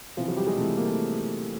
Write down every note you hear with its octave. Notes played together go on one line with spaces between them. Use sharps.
C3 E3 F3 F4
F#3 F#4
G3 G4
G#3 G#4
C3 E3 A3 A4
A#3 A#4
A3 A4